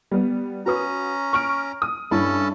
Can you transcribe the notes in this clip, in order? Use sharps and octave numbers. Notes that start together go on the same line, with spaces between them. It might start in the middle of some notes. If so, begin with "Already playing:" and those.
G3 B3
C#4 F#4 B4 A#5 D#6
C#6 F6 D7
D#6
G2 C#4 E4 A4 A5 B5